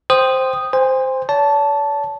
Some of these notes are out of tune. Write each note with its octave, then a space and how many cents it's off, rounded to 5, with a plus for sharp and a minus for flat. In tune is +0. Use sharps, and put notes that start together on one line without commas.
C5 +0 G5 -5 D#6 -10
C5 -5 G#5 -45
C#5 +45 A5 -5